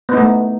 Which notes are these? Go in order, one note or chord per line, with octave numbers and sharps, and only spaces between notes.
A3 B3 D#4